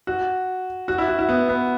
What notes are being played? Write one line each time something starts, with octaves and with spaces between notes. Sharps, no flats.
F#4
F#4
E4
F#4
E4
B3
B3